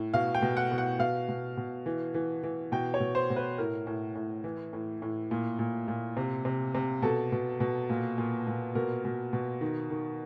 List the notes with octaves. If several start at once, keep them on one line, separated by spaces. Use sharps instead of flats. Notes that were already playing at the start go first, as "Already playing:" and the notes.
Already playing: A2
B2 F5
G5
B2
F#5
B2
F#5
B2 F5
B2
B2
E3
E3
E3
B2 G5
C#5
B2
C5
B2
B4
A2 A#4
A2
A2
E3
A2
A2
A#2
A#2
A#2
C3
C3
C3
B2 A4
B2
B2
A#2
A#2
A#2
B2 A#4
B2
B2
D#3
D#3